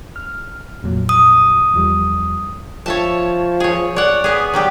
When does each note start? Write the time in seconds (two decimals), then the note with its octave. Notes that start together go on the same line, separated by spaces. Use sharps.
0.16 F6
0.83 F2 A#2 F#3
1.09 D#6
1.74 E2 F3 G3
2.86 F3 C#5 E5 A5
3.60 G#4 C#5
3.96 C#5 D5 F#5
4.24 B3 G#4
4.53 F#3 G3 G4